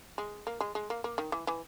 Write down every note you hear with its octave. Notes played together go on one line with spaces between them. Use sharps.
G#3
A#3
G#3
G#3
A#3
A#3
D#3
E3
E3